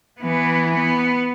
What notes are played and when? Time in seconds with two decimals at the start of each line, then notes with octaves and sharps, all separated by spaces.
0.20 E3 B3
0.75 B3